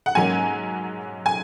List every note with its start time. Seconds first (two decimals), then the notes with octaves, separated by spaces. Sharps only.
0.06 F#5
0.15 G#2 F#3 A#3 C#4 G#5
1.26 G#5